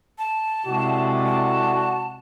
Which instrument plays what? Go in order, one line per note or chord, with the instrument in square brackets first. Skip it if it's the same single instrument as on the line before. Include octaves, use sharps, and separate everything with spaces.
[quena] A5
[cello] C3 G#3 [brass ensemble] E4 A4 D5 [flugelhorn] F#4
[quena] A5